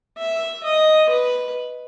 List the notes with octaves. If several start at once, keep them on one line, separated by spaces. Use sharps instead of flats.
E5
D#5
B4